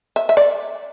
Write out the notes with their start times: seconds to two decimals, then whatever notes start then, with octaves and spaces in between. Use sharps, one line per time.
0.16 E5
0.29 E5
0.37 D5